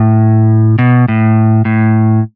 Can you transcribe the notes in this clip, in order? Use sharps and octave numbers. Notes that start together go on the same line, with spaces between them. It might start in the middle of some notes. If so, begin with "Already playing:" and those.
Already playing: A2
B2
A2
A2